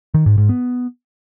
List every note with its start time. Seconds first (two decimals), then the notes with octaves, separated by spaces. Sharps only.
0.14 D#3
0.26 G#2
0.38 G#2
0.49 B3